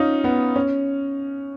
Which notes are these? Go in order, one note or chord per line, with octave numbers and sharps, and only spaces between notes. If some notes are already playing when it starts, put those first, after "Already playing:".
Already playing: C#4 D#4 F4
B3
C#4